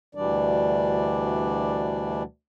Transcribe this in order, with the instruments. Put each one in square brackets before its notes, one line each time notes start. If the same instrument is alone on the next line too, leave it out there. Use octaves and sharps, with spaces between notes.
[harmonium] D2 B2 E3 G3 D4 D5